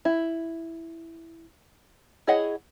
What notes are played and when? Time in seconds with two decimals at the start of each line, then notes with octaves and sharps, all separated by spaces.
0.05 E4
2.27 E4 G#4 C#5 D#5 F#5